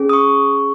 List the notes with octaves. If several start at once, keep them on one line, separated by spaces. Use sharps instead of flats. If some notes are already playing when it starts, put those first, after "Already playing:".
Already playing: C#4 G#4
D#6
C#6